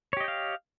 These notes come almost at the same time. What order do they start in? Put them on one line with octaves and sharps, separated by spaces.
C#5 G4 D#5 G5 F5